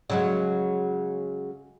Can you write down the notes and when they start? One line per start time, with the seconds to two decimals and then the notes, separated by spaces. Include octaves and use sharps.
0.10 C#3 F#3 G#3